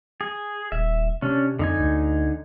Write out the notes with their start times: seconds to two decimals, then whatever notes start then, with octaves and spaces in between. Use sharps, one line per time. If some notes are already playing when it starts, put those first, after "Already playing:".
0.21 G#4
0.72 D#1 E5
1.22 C3 C#4 D4
1.59 F2 D3 D#4 G#5
1.80 D2